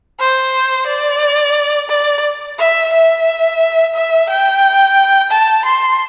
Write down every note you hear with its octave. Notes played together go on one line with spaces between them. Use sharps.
C5
D5
D5
E5
E5
E5
G5
A5
C6